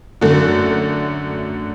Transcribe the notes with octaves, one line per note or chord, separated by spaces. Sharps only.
F#2 D3 A3 F#4